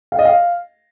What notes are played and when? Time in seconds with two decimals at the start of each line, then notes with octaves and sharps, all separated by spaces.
0.12 F5
0.19 D#5
0.25 F5